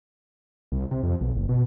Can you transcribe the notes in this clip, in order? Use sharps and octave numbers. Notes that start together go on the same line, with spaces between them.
C2
C3
F2
B1
F#1
B2